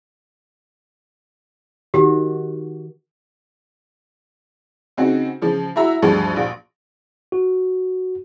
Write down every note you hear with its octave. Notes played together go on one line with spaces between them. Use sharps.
D#3 F#4 G4
C#3 C4 D#4 F#4 G#4
C#3 F3
E4 F#4 E5 A#5
D2 G2 D3 F3 G#3
A#1
F#4